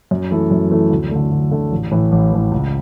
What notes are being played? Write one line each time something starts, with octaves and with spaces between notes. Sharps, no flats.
F#2
E3 A3 E4 A4
F#2
E3 A3 E4 A4
D2
D3 A3
D2
D3 A3
A1
A2 E3
A1
A2 E3
C#2